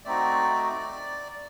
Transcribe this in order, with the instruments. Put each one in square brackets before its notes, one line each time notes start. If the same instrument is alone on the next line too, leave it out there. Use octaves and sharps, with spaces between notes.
[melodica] A3 C4 D#4 F#4 D5